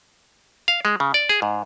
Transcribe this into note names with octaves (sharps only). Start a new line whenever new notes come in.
F5
G#3
C#3
D5
G#4
G#2